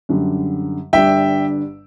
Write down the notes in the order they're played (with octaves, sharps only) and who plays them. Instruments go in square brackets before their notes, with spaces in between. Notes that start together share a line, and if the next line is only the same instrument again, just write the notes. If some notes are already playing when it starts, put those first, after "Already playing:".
[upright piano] F#2 D3 G3
[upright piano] G1 G2 D3 G3 D4 [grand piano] E5 G5